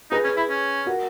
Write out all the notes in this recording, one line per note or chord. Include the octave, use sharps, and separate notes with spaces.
D#4 G#4 B4
C#4
E4
C#4
F#4 A#4